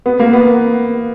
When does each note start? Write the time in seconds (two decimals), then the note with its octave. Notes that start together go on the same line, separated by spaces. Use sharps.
0.06 B3
0.20 A#3
0.33 B3